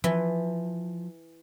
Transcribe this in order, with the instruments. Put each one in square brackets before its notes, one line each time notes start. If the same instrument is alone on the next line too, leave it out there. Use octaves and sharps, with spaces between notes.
[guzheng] E3 [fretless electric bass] F3